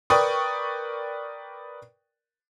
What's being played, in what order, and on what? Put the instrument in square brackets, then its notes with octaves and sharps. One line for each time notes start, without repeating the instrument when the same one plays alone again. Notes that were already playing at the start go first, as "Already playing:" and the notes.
[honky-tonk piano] A#4 B4 D5 G5 C#6 D#6